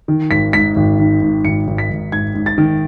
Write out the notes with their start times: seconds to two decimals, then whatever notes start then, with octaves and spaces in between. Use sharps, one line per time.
0.08 D#3
0.30 G#1 B6
0.53 G#2 B6
0.76 G#1
0.99 D#3
1.21 G#2
1.44 G#1 C#7
1.67 G#1
1.78 B6
1.90 G#1
2.12 G#2 G#6
2.35 G#2
2.46 A6
2.58 D#3